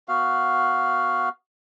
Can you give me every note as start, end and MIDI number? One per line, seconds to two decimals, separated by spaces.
0.08 1.29 59
0.08 1.29 66
0.08 1.29 77